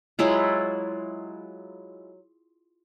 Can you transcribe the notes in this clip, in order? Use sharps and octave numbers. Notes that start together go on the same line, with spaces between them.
F#3 G#3 E4 F4